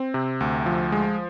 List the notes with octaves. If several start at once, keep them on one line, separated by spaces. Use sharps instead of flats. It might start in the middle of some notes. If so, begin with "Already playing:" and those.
Already playing: C4
C3
D2
F3
G#3